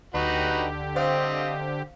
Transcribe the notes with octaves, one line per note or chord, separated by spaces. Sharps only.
D2 D3 D#4 F#4 G4 B4
C4 C5 D#5 F5